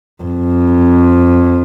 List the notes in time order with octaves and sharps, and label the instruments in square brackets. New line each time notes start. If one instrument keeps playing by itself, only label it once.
[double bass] F2